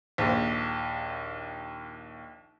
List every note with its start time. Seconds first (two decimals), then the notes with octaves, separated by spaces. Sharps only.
0.18 A#1 D#2